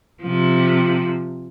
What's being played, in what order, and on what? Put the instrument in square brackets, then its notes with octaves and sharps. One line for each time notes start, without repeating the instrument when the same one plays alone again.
[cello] C3 F3